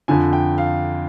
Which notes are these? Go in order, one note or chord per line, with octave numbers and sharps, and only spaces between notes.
F2 D3 F3 G#5
G5
F5